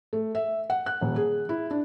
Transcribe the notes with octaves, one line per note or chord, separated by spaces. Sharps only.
A3
E5
F#5
F#6
D#1
G#4
E4
D4